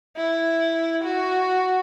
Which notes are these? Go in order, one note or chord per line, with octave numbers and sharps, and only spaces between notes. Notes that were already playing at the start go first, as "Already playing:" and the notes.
E4
F#4